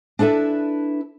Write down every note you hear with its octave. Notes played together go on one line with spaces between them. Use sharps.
D4 E4 A4 B4 E5